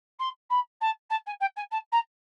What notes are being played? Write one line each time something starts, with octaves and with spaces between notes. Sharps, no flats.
C6
B5
A5
A5
G#5
G5
G#5
A5
A#5